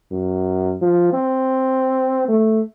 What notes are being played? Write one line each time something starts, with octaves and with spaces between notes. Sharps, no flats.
F#2
F3
C4
A3